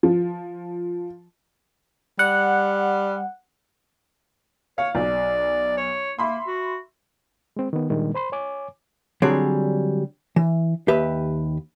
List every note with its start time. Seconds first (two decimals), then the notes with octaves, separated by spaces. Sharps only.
0.03 F3
2.19 G3 F#5
4.78 C#5 F5
4.95 B1 D5
5.77 C#5
6.19 A#3 E5 B5 C6
6.47 F#4
7.57 G#3 C4
7.73 D#3 B3
7.90 A#2 D#3 G3 G#3 A#3 D4
8.14 C5 B5 C6
8.32 C#5 G#5 D6
9.22 D3 F#3 G3 C4 G#4 D5
10.36 E3
10.88 D#2 G4 B4 E5